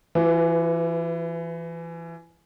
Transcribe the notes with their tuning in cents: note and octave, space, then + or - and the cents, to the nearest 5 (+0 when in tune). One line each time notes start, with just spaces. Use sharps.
E3 +25 F#4 -35 B4 +0